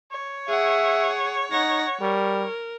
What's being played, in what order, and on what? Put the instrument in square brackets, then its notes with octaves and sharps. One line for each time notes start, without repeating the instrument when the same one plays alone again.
[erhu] C#5
[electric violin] G#4 F#5 [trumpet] E5
[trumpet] D#4 [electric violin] F#5 A#6
[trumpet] G3 [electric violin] A#4